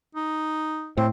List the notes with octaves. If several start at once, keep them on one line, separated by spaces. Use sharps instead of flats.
D#4
A2 C4